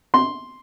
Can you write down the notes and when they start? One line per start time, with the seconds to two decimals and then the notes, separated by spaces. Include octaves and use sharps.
0.14 C6